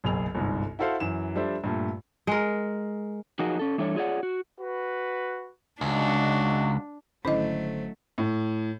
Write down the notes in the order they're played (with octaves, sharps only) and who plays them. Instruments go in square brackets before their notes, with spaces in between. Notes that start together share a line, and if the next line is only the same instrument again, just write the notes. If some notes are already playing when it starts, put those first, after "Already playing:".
[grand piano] F#1 B1 G#4 F7
G1 C2 G#2
E4 F#4 A4 C5 F5 F#5
F#2 E3 E7
F3 G3 D4 A4 C5 E5
G2 A#2 A3
[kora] G#3 A#4
[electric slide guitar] F3 F#3 D#4 F#4 G#4 A#4
C#4 A4
E3 G3 A3 D4 A4 C#5
F4 G#4 C#5 D5 F#5
F#4
[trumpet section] F#4 B4
[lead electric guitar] C#2 [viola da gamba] D4 [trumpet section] D#4 F#4
[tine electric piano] G#1 D3 C5 [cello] F#3 A3 [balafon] C#4 E4 D#5
[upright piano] A2